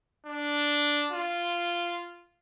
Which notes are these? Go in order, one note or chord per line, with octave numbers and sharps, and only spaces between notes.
D4
F4